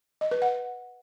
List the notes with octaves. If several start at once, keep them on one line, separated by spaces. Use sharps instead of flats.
D#5
B4
F#5